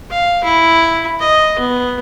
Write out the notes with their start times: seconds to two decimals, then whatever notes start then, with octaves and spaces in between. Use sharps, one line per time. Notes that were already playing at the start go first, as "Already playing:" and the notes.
0.10 F5
0.44 E4
1.20 D#5
1.60 B3